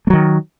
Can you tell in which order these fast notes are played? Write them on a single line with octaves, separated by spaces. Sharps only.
A3 F#3 D#3